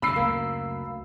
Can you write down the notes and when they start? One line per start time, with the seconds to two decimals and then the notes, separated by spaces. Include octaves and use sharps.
0.02 F1 F#2 C#3 B5 E6 C7
0.16 D2 A#3